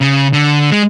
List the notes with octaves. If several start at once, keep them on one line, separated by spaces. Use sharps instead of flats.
C#3
D3
G#3